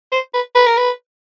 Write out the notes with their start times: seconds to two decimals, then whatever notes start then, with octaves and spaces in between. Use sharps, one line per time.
0.12 C5
0.34 B4
0.55 B4
0.66 A#4
0.77 B4